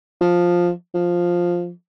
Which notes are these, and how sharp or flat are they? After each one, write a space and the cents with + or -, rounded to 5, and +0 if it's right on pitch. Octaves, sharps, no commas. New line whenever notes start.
F3 +5
F3 +5